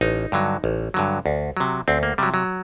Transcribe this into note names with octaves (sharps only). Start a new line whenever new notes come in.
A1 D#4
G2 D3 F#3
A1
G2 D3 F#3
D2
C3 F#3
D2 C4
A#3
C3 F#3 G3
F#3